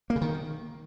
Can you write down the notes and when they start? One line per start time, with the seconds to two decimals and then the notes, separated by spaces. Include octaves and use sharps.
0.10 A#3
0.16 C#3
0.21 D#3